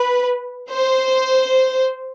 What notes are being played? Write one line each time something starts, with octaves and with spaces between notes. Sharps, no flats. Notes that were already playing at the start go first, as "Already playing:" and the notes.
Already playing: B4
C5